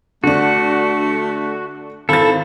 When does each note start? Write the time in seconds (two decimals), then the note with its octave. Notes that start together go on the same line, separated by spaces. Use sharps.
0.24 D3 A3 D4 F#4
2.09 G#1 E4 A4 A6